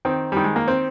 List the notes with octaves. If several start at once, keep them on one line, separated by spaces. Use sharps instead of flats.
D#3 C4
D#3 G3
G#3
A#3
C4